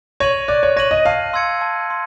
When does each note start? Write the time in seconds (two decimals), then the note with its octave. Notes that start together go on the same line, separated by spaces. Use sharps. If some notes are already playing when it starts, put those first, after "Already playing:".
0.20 C#5 A#6 D#7 F#7
0.48 D5 F#6
0.63 C#5
0.76 C#5 A#6 D#7 F#7
0.91 D#5
1.06 F5 A5
1.33 C6 E6 G#6 C#7
1.61 A5
1.90 C6